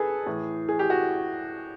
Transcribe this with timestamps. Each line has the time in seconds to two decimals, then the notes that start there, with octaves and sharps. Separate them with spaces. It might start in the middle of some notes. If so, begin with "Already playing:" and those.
Already playing: G#4 A4 B4
0.26 A2 E3
0.69 G#4
0.79 G4
0.90 F#4